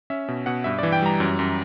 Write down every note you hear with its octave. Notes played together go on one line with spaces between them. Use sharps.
C#4 E5
B2
B2 F#5
G2 E5
E3 D5
G5
G3 A#5
F#2
F#2